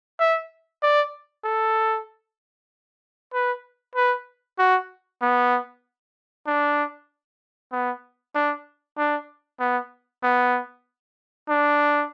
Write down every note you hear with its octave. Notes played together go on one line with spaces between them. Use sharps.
E5
D5
A4
B4
B4
F#4
B3
D4
B3
D4
D4
B3
B3
D4